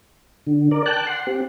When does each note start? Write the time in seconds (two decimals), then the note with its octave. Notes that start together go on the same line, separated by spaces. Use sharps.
0.47 D3
0.71 A#4 D5
0.86 G5 A5 F#6
1.07 F#5 C6
1.27 C4 G4